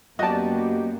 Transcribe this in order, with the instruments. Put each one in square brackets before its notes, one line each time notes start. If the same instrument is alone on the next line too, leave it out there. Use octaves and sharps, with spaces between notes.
[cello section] F#2 A#3 B3 [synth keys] F#4 G4 D5 [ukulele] D#5 A5